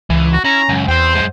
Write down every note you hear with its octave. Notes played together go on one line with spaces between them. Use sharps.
C#2 E3
F#4
C#4 E4 A#5
C#2 F#2
E2 C5 G5 C6
F#2 G#3